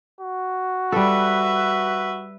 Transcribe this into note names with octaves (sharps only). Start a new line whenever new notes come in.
F#4
G3 A4 B4 E5